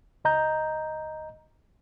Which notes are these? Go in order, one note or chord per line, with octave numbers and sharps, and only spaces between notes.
C#2 D#5 A#5 G6